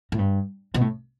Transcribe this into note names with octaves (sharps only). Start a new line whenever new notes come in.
A2
G2
B2
A2